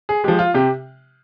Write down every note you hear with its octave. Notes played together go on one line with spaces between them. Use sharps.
G#4
F3 G#3 G4
F4
C3 G4